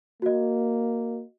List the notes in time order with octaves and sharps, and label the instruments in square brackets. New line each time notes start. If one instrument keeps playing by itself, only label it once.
[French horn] A#3 [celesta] F#4 D#5